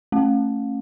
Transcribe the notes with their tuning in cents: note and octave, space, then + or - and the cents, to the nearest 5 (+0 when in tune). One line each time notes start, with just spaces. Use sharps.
A3 +5 C#4 -30